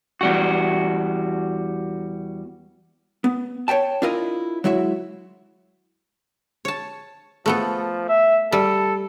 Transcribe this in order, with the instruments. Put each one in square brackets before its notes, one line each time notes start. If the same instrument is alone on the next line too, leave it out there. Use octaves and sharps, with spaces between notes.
[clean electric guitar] E2 G3 F#4
[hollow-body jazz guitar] B3
C#5 E5 G5 A5
D4 E4 F4 A#4 D#5
F#3 G#3 E4 F#4 E5
[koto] C#5 A5
[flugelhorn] F3 [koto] A3 B3 A4
[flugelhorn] E5
[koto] G3 [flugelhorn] A4